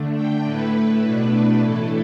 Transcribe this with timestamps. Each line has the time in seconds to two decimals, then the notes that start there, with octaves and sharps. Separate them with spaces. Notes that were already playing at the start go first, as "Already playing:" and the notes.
Already playing: D3 A3 D4
0.15 G5
0.44 A2 A3 E4 B4
1.02 B2 A3 D4 B4
1.31 B4
1.60 A2 E3 A3 E4 A4